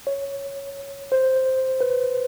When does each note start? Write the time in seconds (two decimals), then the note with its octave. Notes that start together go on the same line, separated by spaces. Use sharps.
0.07 C#5
1.12 C5
1.81 B4